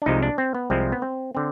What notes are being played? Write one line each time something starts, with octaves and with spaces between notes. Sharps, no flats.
D4
C2 C3 F3 G#3 D#4
D4
C4
B3
C2 C3 F3 G#3 C4
B3
C4
D3 C4